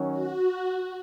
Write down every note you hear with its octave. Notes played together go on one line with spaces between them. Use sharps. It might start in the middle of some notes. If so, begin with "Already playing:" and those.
Already playing: D#3 F#3 C#4
F#4